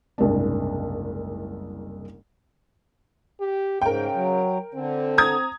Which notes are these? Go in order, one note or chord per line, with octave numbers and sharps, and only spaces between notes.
F#1 C2 G#2 D4
G4
G#2 C#3 A#4 G5
F#3
D3 C4
A#5 D#6 G#6